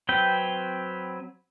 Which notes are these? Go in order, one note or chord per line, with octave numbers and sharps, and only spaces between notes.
F#3 C4 B4 G5